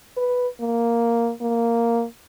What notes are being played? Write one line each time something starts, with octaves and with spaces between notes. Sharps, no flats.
B4
A#3
A#3